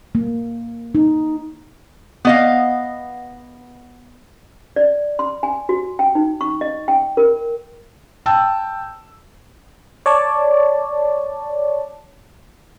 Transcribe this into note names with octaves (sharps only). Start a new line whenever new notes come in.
A#3
D#4
B3 D#5 F5
D5
C6
G#5
F#4
G5
D#4
C#6
D#5
G5
A#4
G5 A5 E6
C#5 D5 A5